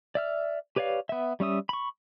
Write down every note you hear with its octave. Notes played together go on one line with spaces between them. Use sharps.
D5 E5 F6
G4 B4 C#5 D5 F5
B3 E5
G3 C#4 E5 D#6
B5 C#6